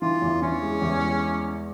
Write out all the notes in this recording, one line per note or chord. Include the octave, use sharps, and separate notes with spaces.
E3 F4
E2
E3 C#4
G#3
E2
G#3